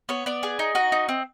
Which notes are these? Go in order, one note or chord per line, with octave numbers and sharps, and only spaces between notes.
B3 C#5
B3 D5
G#4
D#4
F#4 D#5
D#4
C4